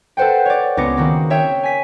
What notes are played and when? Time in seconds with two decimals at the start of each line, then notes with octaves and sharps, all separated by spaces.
0.17 A4 B4 C5 F#5 G5
0.46 C#5 D5
0.77 C#2 B3 C4 D6 A#6 C#7
0.97 D#3 A#3 C4 F#4
1.30 C#5 E5 G5
1.63 G#5 B6 D#7